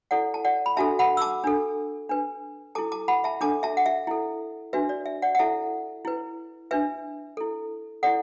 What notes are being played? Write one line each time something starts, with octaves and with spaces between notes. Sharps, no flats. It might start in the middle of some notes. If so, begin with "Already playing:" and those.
E4 A4 D5 F#5
A5
D5 F#5
B5
D4 F#4 A4 E5 A5
F#5 B5
E6
A5 D6
D4 A4
D4 B4
E4 A4 A5 D6
A5 D6
F#5 B5
E5 A5
D4 A4 A5 D6
E5 A5
F#5
E5
E4 A4
D4 F#4 B4 E5
D5
E5
D5 F#5
F#5
E4 A4 E5 A5
E4 B4
D4 B4 E5
E4 A4
E4 A4 D5 F#5